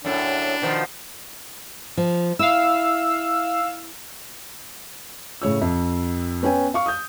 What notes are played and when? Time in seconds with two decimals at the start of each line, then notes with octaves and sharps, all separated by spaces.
0.05 F#2 A2 D4
0.62 B2 D#3 F3
1.97 F3
2.39 E4 F5 E6
5.42 A2 C#3 C#5 E6
5.61 F2
6.43 B3 C#4 B4 G5 G#5
6.74 F5 C#6
6.86 D#6 G6